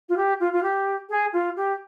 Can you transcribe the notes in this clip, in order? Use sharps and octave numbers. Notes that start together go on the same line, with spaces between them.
F4
G4
F4
F4
G4
G#4
F4
G4